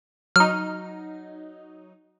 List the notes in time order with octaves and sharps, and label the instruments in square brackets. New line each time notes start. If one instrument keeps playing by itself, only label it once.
[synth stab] F#3 D#4 [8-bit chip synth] F6